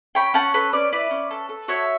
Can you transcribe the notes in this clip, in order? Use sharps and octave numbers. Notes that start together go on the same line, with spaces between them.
C#4 G5 B5
C#4 F#5 A5
A4 B4
C#4 B4 D5
E4 B4 D5
C#4
A4
A4
F#4 C#5 E5